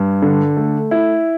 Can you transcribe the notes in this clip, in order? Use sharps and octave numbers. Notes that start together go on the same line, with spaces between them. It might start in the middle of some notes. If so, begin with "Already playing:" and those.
Already playing: G2
D3
A3
E4